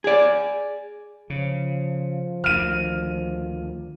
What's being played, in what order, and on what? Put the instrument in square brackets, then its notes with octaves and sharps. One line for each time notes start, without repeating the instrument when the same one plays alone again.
[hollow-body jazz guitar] G#4 D5
[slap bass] C#3 [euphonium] F3
[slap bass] D2 D#3 [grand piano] F6 D#7